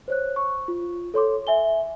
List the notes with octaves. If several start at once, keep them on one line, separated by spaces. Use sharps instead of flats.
C5 C#5 F#6
C#6
F4
A4 C#5 C6 D6
E5 G#5 G7